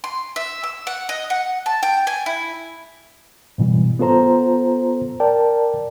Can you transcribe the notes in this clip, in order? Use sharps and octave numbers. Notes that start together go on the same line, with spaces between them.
C6
E5
E6
F#5
D#5
F#5
A5
G5
G#5
E4
G#2 B2 E3 G3
B3 F4 A4 C5 A#5
A#4 D5 G5 A5